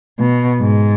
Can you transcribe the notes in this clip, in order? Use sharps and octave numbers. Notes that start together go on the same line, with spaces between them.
B2
G#2